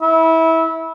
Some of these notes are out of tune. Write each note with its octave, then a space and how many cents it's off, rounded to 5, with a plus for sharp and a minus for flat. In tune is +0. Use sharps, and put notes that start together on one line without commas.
E4 -25